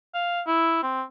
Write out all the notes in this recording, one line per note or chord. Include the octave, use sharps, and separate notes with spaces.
F5
E4
C4